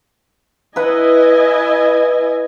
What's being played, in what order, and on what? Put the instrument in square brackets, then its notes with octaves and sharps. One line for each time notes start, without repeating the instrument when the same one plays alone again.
[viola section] E4 D#5 G#5 [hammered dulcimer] B4 F#5